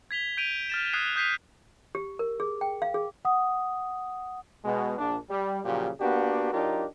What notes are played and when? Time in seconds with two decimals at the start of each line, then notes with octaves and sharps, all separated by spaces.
0.11 G#6 B6 F7 G7
0.37 G6 D7 D#7 F7
0.70 F6 A6 E7
0.93 D#6 F#6 G#6 C7 D#7
1.16 D#6 G6 B6 C7 D#7
1.95 G4
2.19 A#4
2.40 G#4
2.61 G5
2.82 F5
2.94 G#4
3.25 F#5 D#6
4.65 B2 G#3
4.99 A#1 D4
5.30 G3
5.65 A#2 C#3 F3 F#3 G4
6.00 A#3 B3 D4 F#4 G4
6.53 F#3 D4 D#4 F4 G4 A#4